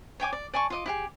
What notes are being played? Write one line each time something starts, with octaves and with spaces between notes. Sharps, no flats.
C#5 G5 G#5 D6
D5
D5 G#5 A5 C#6
F4 D#5 D6
E4 G4 G#4